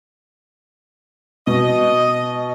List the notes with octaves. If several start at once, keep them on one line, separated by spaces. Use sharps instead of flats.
B2 D#5